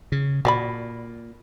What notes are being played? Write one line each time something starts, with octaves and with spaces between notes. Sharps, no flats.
C#3
A#2 F#4 D5 B5